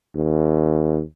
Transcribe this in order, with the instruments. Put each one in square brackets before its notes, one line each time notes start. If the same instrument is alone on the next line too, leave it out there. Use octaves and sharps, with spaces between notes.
[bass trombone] D#2